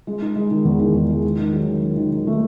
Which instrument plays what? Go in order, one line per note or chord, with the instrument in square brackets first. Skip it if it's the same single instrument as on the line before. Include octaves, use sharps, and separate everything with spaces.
[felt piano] G#3
D#4
G#3
D#3
E2
D#3
E2
G#3
D#3
D#3
F#3
D#3
D#3
D#3
D#3
A3